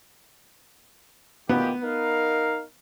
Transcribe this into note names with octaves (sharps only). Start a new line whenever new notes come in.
A#2 D#3 B3 G4
D#4 A#4 F5